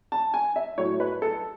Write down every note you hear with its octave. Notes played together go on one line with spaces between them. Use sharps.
A5
G#5
E5
A2 F#3 A3 C#5
B4
A4